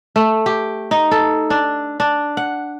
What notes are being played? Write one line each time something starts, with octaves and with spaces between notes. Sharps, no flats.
A3
G4
D#4
A4
D4
D4
F#5